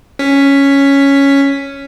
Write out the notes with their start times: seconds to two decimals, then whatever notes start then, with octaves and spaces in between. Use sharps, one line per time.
0.19 C#4 B6